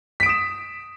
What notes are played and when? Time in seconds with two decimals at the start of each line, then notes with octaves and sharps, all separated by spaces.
0.20 B6
0.23 D7
0.26 D#6
0.29 E7